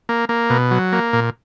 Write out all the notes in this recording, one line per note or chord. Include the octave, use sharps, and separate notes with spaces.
A#3
A#3
B2
F#3
A#3
A#2